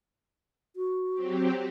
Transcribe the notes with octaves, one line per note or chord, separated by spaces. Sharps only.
F#4
F#3 C4 G4